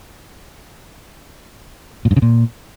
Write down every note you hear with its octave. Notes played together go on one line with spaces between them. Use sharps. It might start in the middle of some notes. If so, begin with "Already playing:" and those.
A#2
G2
C#3
A#2